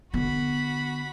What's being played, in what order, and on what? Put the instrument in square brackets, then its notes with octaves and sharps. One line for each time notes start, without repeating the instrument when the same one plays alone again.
[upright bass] D3 B3 [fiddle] F#4 B5